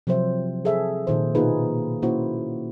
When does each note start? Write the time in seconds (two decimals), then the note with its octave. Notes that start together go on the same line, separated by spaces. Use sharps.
0.07 C3 F3 F#3 C4 C5 E5
0.65 G#4 A4 E5
1.07 A#2 D#3 C5
1.35 B2 A#3 D#4 F4 G#4 B4
2.02 A#3 C#4 E4 F#4 C5